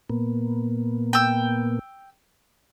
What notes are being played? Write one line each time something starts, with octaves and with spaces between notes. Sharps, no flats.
A#2 A#3 B3
G5 E6